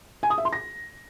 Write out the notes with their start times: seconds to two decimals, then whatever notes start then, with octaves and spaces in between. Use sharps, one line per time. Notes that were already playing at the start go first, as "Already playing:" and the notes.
0.23 G#5
0.30 D#6
0.38 E5
0.45 C6
0.53 A#6